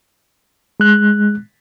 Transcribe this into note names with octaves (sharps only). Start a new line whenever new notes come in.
G#3 F#6